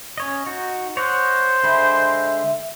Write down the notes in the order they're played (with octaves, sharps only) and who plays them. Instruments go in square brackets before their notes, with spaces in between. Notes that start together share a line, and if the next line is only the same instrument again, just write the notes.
[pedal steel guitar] C#4 C#5 D#5
D#4 F#4
[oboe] C5 [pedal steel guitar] C#5 D#5 F#5
[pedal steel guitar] D3 G#3 B5 [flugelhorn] E5